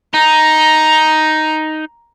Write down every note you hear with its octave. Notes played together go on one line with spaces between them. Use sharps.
D#4 A#5